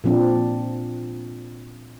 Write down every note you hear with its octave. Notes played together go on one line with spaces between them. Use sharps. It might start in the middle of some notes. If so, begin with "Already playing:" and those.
A#2 F3 C4 D4